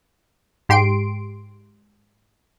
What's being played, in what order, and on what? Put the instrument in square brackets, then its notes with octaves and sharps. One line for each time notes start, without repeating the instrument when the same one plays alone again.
[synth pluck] G#2 G4 C6 D7